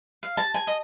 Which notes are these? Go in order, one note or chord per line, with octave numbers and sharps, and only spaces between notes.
F5
A5
G#5
D#5